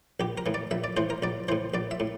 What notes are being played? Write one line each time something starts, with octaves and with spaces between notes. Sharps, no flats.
A#1 G4
A#4
A2 E3
D5
A#1 E5
D5
A2 E3 C5
A#4
A#1 D5
A2 E3 C5
A#1 D5
E5
A2